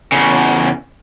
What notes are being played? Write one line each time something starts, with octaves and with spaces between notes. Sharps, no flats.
E2 C#3